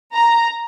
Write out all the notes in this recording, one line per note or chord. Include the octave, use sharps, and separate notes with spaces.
A#5